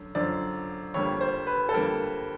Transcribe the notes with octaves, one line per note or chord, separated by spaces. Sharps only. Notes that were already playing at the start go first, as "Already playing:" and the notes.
Already playing: F#2 D3
F#2 D3 F3 D5
F2 D3 G3 A#3 C#5
C5
B4
A4
F2 D3 G3 A#3 A#4